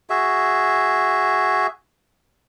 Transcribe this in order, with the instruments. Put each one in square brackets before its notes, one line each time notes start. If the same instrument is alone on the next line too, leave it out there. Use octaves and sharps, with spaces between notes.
[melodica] F#4 G#4 E5